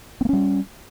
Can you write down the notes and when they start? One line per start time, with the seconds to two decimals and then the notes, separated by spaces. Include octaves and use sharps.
0.21 C4
0.25 A#3
0.29 C#4
0.33 G3